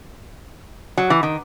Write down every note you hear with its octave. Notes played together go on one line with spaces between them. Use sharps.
F#3
E3
D#3